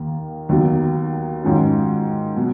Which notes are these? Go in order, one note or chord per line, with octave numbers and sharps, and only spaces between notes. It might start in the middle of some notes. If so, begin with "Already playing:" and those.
Already playing: D#2 D#3 A#3
D#2 D#3 F#3 B3 F#4
G#2 D#3 F#3 C#4 F4
B2 F#3